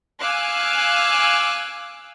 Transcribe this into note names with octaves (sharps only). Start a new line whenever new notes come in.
F5 G#5 D6 E6 F#6